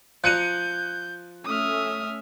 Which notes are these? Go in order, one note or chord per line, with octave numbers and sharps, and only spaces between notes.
F3 A#5 F#6 G6 C#7 D#7
A3 C#4 E5 D#6 F6